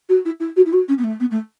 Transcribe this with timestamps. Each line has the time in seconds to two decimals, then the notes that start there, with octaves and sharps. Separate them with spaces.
0.09 F#4
0.25 E4
0.40 E4
0.56 F#4
0.66 E4
0.73 F#4
0.88 C#4
0.98 B3
1.04 A3
1.20 B3
1.31 A3